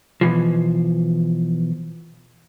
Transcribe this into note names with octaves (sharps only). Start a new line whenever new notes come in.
B2 E3 F3